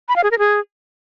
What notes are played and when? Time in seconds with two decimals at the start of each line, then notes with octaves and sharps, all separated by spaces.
0.09 B5
0.16 F5
0.24 G#4
0.31 A#4
0.39 G#4